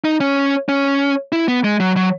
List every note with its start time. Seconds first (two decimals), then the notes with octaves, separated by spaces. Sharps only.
0.04 D#4
0.20 C#4
0.69 C#4
1.32 E4
1.48 B3
1.64 G#3
1.80 F#3
1.96 F#3